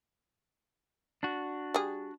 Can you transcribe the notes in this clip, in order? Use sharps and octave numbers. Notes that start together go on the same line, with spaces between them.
D4 F#4
G3 G#4